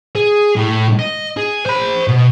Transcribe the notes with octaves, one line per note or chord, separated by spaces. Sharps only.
G#4
A2
D#5
G#4
C5 B5
B2